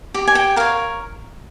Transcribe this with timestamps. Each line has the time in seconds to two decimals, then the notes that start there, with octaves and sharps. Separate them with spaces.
0.14 G4
0.28 G#5
0.35 G5
0.56 A#4 C#5 F5